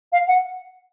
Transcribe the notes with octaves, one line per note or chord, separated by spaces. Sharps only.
F5
F#5